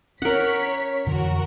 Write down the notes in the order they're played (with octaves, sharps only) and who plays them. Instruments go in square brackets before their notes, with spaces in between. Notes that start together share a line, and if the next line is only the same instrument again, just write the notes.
[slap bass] C#4 [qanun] A#4 F#5 [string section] C#5 B6
[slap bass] F2 D3 E3 [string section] F#4 A#4